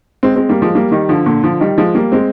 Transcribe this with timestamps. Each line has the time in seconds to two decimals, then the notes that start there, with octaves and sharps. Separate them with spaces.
0.23 G#3 C4
0.36 G#3 C4
0.49 G3 A#3
0.62 F3 G#3
0.75 G3 A#3
0.92 D#3 G3
1.09 D3 F3
1.26 A#2 D3
1.43 D3 F3
1.60 D#3 G3
1.78 F3 G#3
1.95 G3 A#3
2.12 G#3 C4